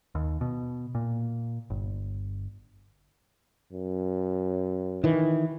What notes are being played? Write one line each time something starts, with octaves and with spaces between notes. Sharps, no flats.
D#2
B2
A#2
G1
F#2
D#3 E3